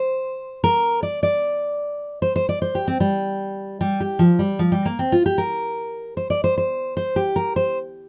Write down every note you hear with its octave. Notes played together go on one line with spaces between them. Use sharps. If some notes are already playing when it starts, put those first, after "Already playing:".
Already playing: C5
A#4
D5
D5
C5
C5
D5
C5
G4
C4
G3
G3
G4
F3
G3
F3
G3
A#3
C4
F4
G4
A#4
C5
D5
C5
C5
C5
G4
A#4
C5